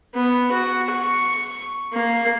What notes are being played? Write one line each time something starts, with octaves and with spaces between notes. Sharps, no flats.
B3
F#4
C#6
A#3